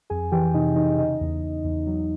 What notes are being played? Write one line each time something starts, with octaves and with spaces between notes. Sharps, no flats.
F2 G#4 G#5
E3 G4 G5
C3 D#4 D#5
E3 D#4 D#5
C#3 D#4 D#5
E2
E2
E2
F#3